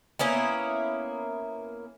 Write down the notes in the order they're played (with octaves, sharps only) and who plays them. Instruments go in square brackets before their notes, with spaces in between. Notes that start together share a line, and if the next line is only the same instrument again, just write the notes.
[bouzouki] A#3 B3 C#4 E4